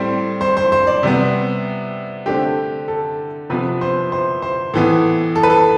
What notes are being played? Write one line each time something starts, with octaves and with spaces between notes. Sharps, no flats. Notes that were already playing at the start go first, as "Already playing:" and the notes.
Already playing: A2 G3 C4 C5
C5
C5
C5
D5
C3 G3 B3
D3 A3 C4 G4
A4
C3 F3 B3 B4
C5
C5
C5
A2 E3 B3
A4
B4
A4